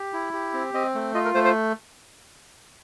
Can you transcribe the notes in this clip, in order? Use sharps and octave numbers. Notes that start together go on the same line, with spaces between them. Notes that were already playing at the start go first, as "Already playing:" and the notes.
Already playing: G4
E4
G4
C4
C4 D#5
A3
F4 D#5
A#4
A3 C5
C5